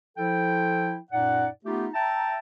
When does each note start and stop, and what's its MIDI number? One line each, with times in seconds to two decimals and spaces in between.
0.17 0.96 53
0.17 0.96 64
0.17 0.96 69
0.17 0.96 79
1.12 1.47 42
1.12 1.47 46
1.12 1.47 63
1.12 1.47 74
1.12 1.47 78
1.65 1.87 57
1.65 1.87 59
1.65 1.87 63
1.65 1.87 65
1.65 1.87 67
1.94 2.39 76
1.94 2.39 79
1.94 2.39 81
1.94 2.39 82